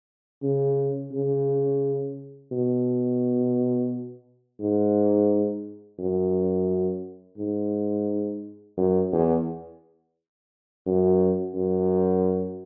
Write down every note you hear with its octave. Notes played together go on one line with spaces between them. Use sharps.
C#3
C#3
B2
G#2
F#2
G#2
F#2
E2
F#2
F#2